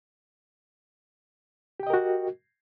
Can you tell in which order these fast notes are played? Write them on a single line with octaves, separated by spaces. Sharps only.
G4 G5 D#5 A#4 F#4